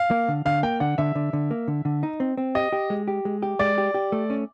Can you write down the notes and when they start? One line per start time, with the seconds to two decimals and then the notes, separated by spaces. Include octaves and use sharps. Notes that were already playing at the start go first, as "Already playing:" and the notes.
Already playing: F5
0.11 A#3
0.28 D3
0.45 D3 F5
0.63 A#3 G5
0.80 D3 F#5
0.98 D3 E5
1.15 D3
1.33 D3
1.51 A#3
1.68 D3
1.85 D3
2.03 D#4
2.20 C4
2.37 C4
2.55 G4 D#5
2.73 G4
2.90 G#3
3.08 G4
3.25 G#3
3.42 G4
3.59 G#3 D5
3.78 G4
3.94 G4
4.12 A3
4.30 C#4